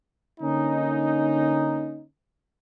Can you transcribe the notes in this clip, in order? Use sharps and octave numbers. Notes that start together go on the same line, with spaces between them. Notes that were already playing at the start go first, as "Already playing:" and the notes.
D3 A#3 C#4 D#4